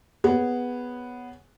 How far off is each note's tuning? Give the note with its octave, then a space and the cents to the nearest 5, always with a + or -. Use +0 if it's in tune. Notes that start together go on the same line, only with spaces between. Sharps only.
B3 +0 G#4 -10 C#5 +0